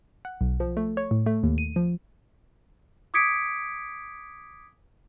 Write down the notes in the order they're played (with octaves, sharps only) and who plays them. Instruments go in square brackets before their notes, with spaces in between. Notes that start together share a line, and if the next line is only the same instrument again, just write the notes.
[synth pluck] F#5
B1
F3
A3
C#5
A2
A3
D#2
D#7
F3
[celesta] D6 D#6 G#6 B6 C#7 D7